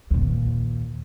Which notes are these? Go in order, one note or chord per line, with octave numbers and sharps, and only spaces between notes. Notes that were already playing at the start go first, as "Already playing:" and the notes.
D#2 A#2